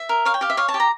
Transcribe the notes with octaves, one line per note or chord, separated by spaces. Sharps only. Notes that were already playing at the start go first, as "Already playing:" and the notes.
Already playing: E5
A#4
C#5 F5
G5
G4 F5
E5
C#5 F5
A5
G4
A#5